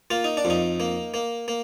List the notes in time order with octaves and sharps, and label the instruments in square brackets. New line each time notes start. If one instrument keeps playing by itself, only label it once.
[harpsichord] A#3 F4
D#4
D4
F2
D#4
A#3
A#3
A#3